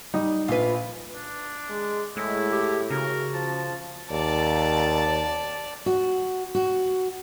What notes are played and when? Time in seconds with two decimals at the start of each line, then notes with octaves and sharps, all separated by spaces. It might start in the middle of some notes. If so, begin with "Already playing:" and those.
0.14 G3 D#4 D#5
0.48 A#1 F4 B4
1.15 D4
1.69 G#3
2.17 A2 G#3 E4
2.51 G4
2.91 C#3 F#4 A#4
3.34 F3 A5
4.11 D#2 D5 A5
5.86 F#4
6.55 F#4